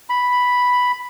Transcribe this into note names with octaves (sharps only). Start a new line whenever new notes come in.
B5